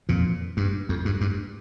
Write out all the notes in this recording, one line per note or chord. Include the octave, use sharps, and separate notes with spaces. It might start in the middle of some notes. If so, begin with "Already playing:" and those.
F2 A#2
G2
F2
G2
G2